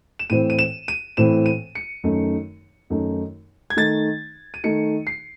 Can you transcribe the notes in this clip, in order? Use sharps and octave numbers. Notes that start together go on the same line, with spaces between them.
E7
A2 E3 C4 D#7
D#7
E7
D#7
A2 E3 C4 E7
D#7
C#7
F#2 D#3 A3 D#4
F#2 D#3 A3 D#4
G#6
D#3 A3 D#4 A6
D#7
D#3 A3 D#4 C#7
C7